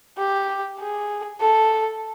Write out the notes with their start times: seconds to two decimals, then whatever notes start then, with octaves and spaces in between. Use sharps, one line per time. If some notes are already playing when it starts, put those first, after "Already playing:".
0.18 G4
0.80 G#4
1.41 A4